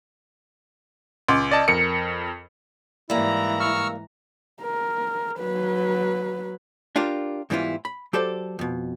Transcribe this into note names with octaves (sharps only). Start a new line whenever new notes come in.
C#2 C6 D6
D5 D#5 A5
F2 A#4 C#7
G#2 E3 G3 A#3 E4 A#5
C#6 E6 F6
A#4
F#3 B4
D4 F4 G4 A#4
G#2 E3 G3 B3 E4 F4
B5
F#3 G4 A4 C5 D5
F2 B2